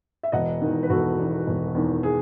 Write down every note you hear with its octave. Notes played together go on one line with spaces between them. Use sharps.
E5
E1 D#5 F#5
E2 D#3
B4
E1 F#4 A4
E2 D#3
E1
E2 D#3
G#4